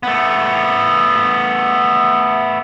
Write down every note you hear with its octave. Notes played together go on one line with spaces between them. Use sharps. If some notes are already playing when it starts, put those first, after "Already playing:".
A3 B3